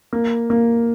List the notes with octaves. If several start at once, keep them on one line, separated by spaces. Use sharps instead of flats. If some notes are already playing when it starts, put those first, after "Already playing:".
A#3
A#3